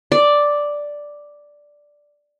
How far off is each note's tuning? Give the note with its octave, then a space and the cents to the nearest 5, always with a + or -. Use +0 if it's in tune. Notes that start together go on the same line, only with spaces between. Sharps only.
D5 +0